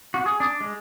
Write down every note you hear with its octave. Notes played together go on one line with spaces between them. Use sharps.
F#4
G#4
D4
G#3